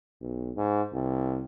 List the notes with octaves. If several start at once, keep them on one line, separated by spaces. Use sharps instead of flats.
B1
G#2
C2